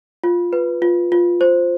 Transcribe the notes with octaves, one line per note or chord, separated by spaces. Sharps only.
F4
B4
F4
F4
C5